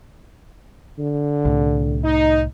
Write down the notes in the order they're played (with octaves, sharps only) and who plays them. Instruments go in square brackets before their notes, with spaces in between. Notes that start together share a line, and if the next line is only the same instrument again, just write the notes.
[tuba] D3
[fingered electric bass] C2 A2
[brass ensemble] D#4